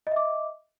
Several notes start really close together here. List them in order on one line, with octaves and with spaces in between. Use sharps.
D#5 E5 D6